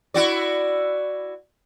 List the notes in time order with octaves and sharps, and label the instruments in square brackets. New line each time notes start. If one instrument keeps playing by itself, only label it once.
[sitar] E4 F#4 D5